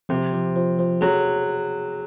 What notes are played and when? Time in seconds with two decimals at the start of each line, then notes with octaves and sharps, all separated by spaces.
0.09 C3 F3
0.33 F3
0.56 F3
0.79 F3
1.01 F#3 G#4